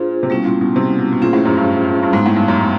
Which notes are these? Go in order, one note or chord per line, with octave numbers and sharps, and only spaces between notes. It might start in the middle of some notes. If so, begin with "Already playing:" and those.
Already playing: A#2 D4 F4 G#4 C5
C3
B2 G3 A#3 C#4 E4
A#2
B2
C3
B2
B2
A#2 C#4 F4 G#4 C5
A2
F#2
G2
G2
G#2 G#3 B3 D#4
A2
G2
F#2